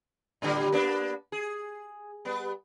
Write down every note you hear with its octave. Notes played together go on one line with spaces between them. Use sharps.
A2 D3 G3
A#3 B3 D4
G#4
G3 B3